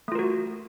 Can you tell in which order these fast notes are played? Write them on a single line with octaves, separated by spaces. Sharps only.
A3 F4 A#4 F#4